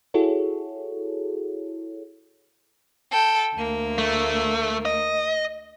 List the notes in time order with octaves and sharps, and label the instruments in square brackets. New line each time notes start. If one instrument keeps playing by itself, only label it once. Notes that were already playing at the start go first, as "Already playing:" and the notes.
[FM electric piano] E4 F#4 G#4 A4 C#5
[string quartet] A4 G5
D2 A#3
[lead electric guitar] A3
D#5